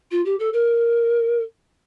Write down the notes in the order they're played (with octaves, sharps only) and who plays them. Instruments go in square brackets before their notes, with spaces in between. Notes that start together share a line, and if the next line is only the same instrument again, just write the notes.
[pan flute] F4
G4
A4
A#4